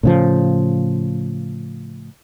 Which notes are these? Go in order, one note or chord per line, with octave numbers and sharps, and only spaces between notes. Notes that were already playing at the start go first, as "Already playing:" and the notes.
A2 C#3 F3